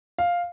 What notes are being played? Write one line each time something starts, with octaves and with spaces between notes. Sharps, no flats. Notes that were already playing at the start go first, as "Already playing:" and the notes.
F5